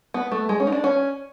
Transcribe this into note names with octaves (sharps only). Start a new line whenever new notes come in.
B3
A3
G#3
C#4
D#4
D4
C#4